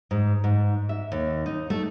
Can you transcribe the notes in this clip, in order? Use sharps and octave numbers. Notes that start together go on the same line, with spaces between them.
G#2
G#2
E5
D#2
D#4
A3